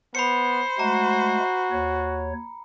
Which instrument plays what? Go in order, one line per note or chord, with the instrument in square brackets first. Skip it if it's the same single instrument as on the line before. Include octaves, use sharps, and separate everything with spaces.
[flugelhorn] B3 [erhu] C5 [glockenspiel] B5 C#7
[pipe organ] G#3 A3 [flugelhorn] F#4 [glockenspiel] A#5
[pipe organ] D#2 C#5